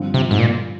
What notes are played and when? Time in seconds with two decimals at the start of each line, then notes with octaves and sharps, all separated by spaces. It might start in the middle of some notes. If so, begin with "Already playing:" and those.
Already playing: G2 D3 F3 C4 F4
0.14 C3
0.31 G#2
0.39 A#2